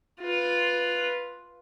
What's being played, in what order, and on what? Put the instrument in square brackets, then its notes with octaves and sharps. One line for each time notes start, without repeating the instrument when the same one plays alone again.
[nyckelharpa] F4 B4